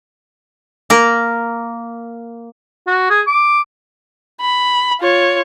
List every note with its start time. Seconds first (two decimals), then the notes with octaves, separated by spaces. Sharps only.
0.90 A#3 A#4
2.87 F#4
3.10 G#4
3.27 D6
4.41 B5
5.00 F4 C#5